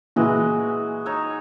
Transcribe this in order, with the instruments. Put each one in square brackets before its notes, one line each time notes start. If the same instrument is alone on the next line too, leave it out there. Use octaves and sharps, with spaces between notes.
[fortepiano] A#2 E3 E4 [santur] G#3 F#4 B4
[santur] D#4 C#5 E6